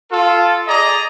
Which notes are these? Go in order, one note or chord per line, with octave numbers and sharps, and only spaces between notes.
F4 A4
G#4 D5 D#5 A#5